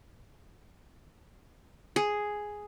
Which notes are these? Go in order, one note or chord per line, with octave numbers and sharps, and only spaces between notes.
G#4